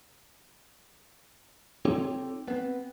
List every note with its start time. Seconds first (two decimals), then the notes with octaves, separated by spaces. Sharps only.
1.85 C4 D#4 F4 G4 A4 C#5
2.48 B3 C4